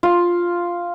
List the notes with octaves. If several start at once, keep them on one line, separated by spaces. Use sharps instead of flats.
F4